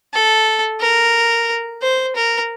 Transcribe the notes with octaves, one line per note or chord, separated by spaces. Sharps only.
A4
A#4
C5
A#4